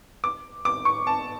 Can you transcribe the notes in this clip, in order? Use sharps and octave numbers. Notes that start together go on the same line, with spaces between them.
D6
D6
C#6
A5